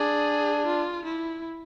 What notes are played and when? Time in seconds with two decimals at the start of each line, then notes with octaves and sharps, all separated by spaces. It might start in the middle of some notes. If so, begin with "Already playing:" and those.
Already playing: D4 G#4
0.67 F4
1.05 E4